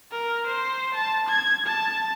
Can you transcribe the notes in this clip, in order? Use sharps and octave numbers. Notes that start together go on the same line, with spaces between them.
A#4
C5
A5
G#6
A5